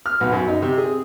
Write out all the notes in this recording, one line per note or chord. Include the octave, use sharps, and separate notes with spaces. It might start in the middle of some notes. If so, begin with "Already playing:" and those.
F6
B1
F#2
D#4
C3
G#4